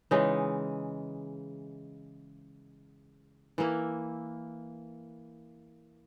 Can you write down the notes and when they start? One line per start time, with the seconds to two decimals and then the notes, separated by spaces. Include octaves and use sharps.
0.11 C#3 E3 G#3 D#4
3.58 E3 A#3 E4